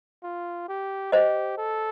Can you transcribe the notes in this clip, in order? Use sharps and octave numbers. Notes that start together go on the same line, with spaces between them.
F4
G4
G4 C5 D#5
A4